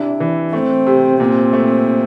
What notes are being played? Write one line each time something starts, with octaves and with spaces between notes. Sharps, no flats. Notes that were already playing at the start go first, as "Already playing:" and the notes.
Already playing: C3 D4 E4
E3
A3 C4
C3
A#2 C4
A3